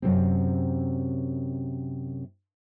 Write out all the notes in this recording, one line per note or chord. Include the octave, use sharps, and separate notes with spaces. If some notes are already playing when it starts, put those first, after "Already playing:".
F#2 C3 C4